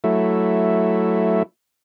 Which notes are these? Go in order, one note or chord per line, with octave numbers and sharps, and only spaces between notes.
F#3 A3 E4